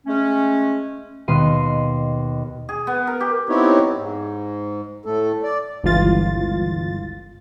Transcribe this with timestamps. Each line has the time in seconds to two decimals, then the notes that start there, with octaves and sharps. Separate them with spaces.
0.07 G#3 A3 C#4
1.28 D#2 B2 C6 D#7
2.69 G#4
2.87 B3
3.07 A#4
3.21 G4
3.49 B3 C4 D#4 E4 G4 C#5
3.96 G#2
5.05 A2 A3 A4
5.43 D5
5.84 G1 C#2 E3 F4 A6